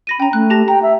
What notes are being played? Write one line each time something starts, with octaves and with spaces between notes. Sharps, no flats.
B5 A#6 D#7
C#4 G5 A#5
A3 F#6
G4 A5 A#6
G5 A#5
E5